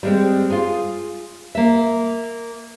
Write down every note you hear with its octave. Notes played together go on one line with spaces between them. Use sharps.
G3 G#3 C4
F4 G#4
A#3 E5